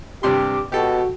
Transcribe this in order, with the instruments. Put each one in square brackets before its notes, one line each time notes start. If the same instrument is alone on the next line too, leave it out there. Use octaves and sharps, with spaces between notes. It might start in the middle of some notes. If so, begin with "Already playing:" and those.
[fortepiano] G2 C3 C6 [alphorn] G4 [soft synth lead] D6
[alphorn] B2 [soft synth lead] F#4 [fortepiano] G4 A4